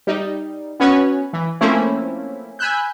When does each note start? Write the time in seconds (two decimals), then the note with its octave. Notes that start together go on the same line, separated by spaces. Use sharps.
0.07 G3 D#4
0.80 B3 C#4 F#4 B4 C#5
1.33 E3
1.61 F3 A3 A#3 C4 C#4 E4
2.59 G#5 B5 E6 F#6 G6